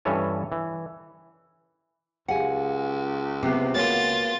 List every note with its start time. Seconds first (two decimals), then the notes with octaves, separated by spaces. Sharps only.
0.05 G2 E3 C#4 A4 C#5 G#5
0.52 E3
2.28 C#2 G4 G#4 F5 F#5 G#5
3.43 C3 B3 D6 F#6 C7
3.75 G#3 A#3 B3 F4 F#4 C#5 F#5 A6